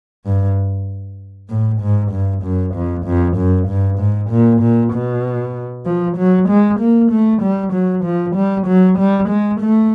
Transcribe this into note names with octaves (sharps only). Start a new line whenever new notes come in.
G2
A2
G#2
G2
F#2
F2
F2
F#2
G2
G#2
A#2
A#2
B2
F3
F#3
G#3
A#3
A3
G3
F#3
F3
G3
F#3
G3
G#3
A3